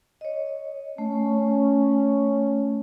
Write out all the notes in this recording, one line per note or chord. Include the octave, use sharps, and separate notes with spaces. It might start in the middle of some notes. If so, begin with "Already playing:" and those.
C#5 D#5
A3 C#4